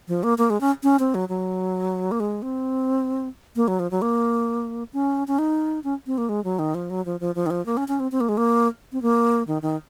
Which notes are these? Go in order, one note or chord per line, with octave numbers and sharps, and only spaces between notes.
F3
A#3
A#3
G#3
C#4
C#4
C4
F#3
F#3
A#3
G#3
C4
A#3
F#3
F3
F#3
A#3
C#4
C#4
D#4
C#4
C4
A#3
G#3
F#3
D#3
F3
F#3
F3
F3
F3
D#3
F3
A#3
C#4
C#4
C4
C4
A#3
G#3
A#3
C4
A#3
D#3
D#3